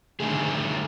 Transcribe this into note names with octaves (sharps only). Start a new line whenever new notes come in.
D3 D#3 A3 G#4